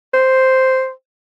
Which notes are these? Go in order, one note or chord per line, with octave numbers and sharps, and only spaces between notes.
C5